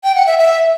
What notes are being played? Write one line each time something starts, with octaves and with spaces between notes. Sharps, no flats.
G5
F#5
E5
E5